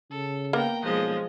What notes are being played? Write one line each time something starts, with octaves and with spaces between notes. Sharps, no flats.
C#3 A4
A#3 B3 G5 A#5
B1 F3 G#3 D#5